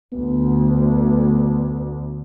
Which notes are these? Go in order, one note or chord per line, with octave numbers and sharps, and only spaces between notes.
D2 B3